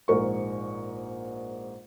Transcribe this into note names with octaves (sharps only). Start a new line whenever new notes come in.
A#1 G#2 A#4 C#6